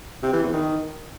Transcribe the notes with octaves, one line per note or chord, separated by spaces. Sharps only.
C3
E3
E2
D#3